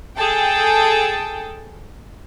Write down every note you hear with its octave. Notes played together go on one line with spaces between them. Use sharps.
G#4 A4 G5 A5